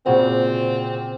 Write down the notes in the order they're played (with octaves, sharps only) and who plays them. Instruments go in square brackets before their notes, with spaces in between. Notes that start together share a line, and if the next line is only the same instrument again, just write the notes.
[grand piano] A#2 C#3 F#4 [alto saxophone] C4 [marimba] C5 F#5